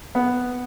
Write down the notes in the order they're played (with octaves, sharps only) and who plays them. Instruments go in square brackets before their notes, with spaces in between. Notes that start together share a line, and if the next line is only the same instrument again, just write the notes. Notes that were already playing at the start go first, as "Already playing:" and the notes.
[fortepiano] B3